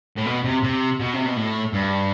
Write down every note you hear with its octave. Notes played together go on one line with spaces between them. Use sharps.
A2
B2
C3
C3
B2
C3
B2
A2
G2